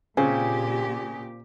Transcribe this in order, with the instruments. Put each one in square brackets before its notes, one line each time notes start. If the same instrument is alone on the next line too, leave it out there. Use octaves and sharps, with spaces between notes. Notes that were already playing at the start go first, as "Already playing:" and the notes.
[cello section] A#2 G4 [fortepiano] C#3 [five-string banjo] C4 F4 [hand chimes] G#5